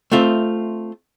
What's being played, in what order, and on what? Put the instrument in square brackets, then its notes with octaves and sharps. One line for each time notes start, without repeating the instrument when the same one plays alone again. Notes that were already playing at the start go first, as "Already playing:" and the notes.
[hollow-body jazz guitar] A3 C4 F4 E5